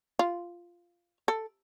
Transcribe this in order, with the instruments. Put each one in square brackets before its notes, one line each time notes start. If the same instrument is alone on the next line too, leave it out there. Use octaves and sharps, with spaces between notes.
[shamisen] F4
A4